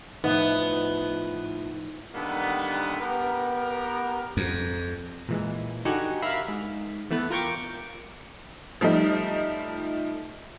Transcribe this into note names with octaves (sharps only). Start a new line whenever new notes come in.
A2 F3 B3 D#4
D3 D#3 G3 A#3 B3
B3 G4 A#4
F2
A#2 E3 G#3
D3 D#4 F#4 G4 F#5 G#5
A#4 E5 F5 B5
G#2
E3 A3 B3 B4
F4 A#4 G5 C#6 D6
F3 G3 A3 D#4